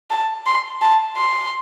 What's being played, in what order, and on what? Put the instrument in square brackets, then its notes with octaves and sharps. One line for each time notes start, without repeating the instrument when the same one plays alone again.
[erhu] A5
C6
A5
C6